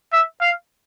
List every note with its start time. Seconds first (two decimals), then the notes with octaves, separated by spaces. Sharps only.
0.12 E5
0.41 F5